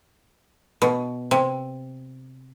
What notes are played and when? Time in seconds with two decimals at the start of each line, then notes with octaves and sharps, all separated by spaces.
0.82 B2
1.31 C3